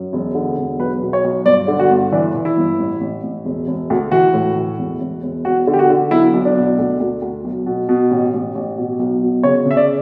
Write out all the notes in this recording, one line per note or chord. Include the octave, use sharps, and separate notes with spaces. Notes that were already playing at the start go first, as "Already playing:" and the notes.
Already playing: F#2
E1
D3
E1
B1 B4
B2
C#5
B1
G1 D5
D3
F#4
G1
E3 D4
E3
E4
G1
A1
A1
A1
E1
E1
D2
E3 F#4
A2
E3
E1
E1
E1
E2 F#4
D3
G4
F#4
D3
B1 E4
B1
D4
B2
D2
D2
D2
B1
B2
B2
A1
A1
A1
B2
B1
B2
C#3 C#5
C#3
E5
D5